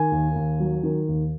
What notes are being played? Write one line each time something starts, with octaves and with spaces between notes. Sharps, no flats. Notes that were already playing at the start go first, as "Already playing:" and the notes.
Already playing: D#3 G#5
D#2
D#2
F#3
D#3
D#2